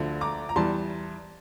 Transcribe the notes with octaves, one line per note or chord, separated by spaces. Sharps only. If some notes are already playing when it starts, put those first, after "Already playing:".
Already playing: D2 D3 F3
A#5 D6
A#5
E2 E3 G3 A5 C6